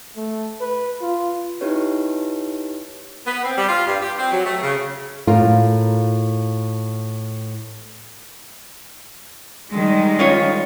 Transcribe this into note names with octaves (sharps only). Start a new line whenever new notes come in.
A3
B4
F4
D#4 E4 G4 B4 C#5
B3
C4
G3
F4
G2
G4
C4
F#3
A3
C#3
A2 F4 A#4
D#3 G3 G#3
C#4 F4 C#5